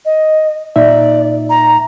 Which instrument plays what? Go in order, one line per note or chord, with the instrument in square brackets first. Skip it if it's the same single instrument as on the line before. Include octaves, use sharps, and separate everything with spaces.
[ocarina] D#5
[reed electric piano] A#2 D#4 E5 [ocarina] D5
[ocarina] A#5